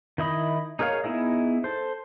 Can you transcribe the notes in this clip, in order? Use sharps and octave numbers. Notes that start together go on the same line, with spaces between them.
D#3 E4 D#5 B5
D#4 G#4 A#4 C#5 F5
B3 D#4 E4 G#4 D#5
A4 C5